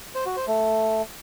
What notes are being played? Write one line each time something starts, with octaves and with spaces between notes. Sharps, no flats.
C5
F#4
C5
A3